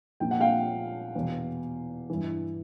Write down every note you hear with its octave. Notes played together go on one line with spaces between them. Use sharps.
A#2 F3 G5
F#5
F5 G5
E2 B2
G2 E3